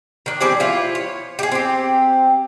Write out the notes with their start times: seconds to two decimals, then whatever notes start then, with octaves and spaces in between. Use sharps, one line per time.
0.26 D#3 D4
0.40 G3 C4 D4 G#4
0.60 F3 E4 F4
0.95 C#5
1.39 G4 G#4
1.52 C4 G4